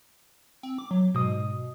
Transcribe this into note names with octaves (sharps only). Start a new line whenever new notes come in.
C4
D6
F#3
G#2 B2 D#6